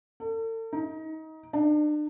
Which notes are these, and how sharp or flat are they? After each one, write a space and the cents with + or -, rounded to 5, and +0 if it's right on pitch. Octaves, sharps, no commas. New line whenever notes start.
A4 +40
D#4 +25
D4 +40